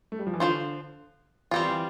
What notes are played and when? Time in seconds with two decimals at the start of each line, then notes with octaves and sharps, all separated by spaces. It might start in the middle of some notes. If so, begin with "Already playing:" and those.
0.12 A3
0.19 G3
0.27 F3
0.34 E3
0.40 D3 F3 C4 F4 C5
1.51 E3 G3 C4 F4
1.68 E3